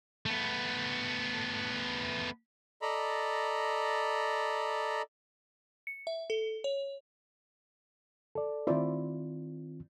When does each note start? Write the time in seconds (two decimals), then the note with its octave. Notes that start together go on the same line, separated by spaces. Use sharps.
0.26 A3 B3
2.82 A4 D5 D#5 A#5 B5
5.87 C#7
6.07 E5
6.30 A4
6.64 C#5
8.35 A4 D5
8.67 D#3 C4 E4 F4 C5 D5